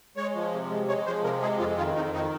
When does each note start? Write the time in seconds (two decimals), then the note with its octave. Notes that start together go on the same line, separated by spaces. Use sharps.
0.16 G#3 C#5
0.35 F3
0.52 C3
0.70 G#3
0.88 G#3 C#5
1.06 F3 C5
1.24 C3 A#4
1.42 G#3 G#4
1.59 F2 F4
1.78 D#3 F4
1.95 F2 D#4
2.13 D#3 D#4